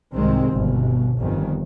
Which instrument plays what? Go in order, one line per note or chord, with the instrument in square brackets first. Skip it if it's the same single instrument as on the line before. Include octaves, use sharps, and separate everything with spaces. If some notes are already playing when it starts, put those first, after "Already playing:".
[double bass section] C2 G#2 D#3 G#3 C4
G1 B2
G1 F2 D#3